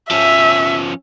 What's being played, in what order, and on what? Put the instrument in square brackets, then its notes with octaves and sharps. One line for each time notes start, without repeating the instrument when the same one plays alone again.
[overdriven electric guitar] F3 C#4 [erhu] E5